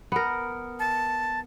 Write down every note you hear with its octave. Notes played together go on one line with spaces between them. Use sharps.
B3 A#4
A5